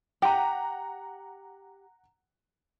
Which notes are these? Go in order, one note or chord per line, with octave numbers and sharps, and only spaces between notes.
G4 F#5 A#5